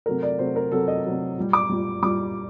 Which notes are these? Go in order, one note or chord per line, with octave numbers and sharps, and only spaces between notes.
C3 F#3 A3 A#4
D5
C3 F#3 A3 C5
A#4
C3 F#3 A3 A4
D#5
C3 F#3 A3
A#2 G3
D6
A#2 G3
A#2 G3 D6